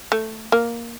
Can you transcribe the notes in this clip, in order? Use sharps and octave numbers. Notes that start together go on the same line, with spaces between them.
A3
A#3